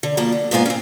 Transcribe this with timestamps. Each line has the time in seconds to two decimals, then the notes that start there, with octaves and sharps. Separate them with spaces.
0.03 D3
0.17 B2 F3 A#3 A5
0.32 D3
0.51 G#2 A#3 B3 F4 G#5
0.66 C4 C#4